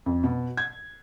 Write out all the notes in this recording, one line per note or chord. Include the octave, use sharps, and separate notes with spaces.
F2
B2
G#6